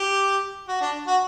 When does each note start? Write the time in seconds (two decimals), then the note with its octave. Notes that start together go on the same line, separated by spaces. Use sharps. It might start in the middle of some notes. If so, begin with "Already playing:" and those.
Already playing: G4
0.68 F#4
0.81 D4
1.07 F#4